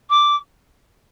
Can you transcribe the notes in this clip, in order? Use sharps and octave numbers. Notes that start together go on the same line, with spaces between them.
D6